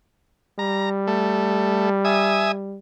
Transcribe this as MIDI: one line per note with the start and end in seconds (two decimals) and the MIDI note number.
0.59 2.78 55
0.59 0.90 82
1.07 1.89 57
2.05 2.52 76
2.05 2.52 80
2.05 2.52 87